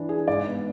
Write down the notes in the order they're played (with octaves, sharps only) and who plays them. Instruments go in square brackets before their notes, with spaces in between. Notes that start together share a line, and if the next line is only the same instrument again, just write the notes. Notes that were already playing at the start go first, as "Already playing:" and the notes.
Already playing: [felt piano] E3 D4
G#4
[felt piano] G#2 [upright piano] D5
[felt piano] B3